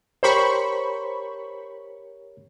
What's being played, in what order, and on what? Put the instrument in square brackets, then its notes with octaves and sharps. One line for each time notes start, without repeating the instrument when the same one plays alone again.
[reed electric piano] G4 A#4 C#5 [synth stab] C5 B5 C#6